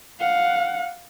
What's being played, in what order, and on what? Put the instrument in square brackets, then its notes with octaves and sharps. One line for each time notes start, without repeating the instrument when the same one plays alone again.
[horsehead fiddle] F5 F#5